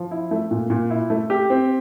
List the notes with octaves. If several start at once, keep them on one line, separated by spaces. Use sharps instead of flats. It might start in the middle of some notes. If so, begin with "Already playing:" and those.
Already playing: F3
E4
A3
A#2
A#2
E4
A3
G4
C4